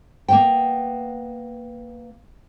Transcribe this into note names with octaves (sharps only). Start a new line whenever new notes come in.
A#3 B3 G5